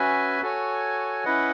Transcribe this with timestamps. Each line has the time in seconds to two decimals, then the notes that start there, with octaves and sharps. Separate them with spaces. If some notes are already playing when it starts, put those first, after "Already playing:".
Already playing: C#4 F#4 B4 E5 G#5
0.43 F#4 A4 C#5 G#5
1.25 C#4 E4 B4 D#5 F#5